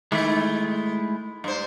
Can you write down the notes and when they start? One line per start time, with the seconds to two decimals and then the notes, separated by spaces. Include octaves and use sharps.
0.12 D#3 G#3 A3 E4
1.44 G2 C5